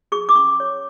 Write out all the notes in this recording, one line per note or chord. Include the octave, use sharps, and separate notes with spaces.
G#4 C#6
D6
C#4 C#6
C#5